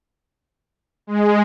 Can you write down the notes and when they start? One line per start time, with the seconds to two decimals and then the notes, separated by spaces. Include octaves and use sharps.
1.07 G#3